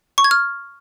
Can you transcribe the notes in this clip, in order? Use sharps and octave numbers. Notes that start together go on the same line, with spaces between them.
C#6
G#6
F6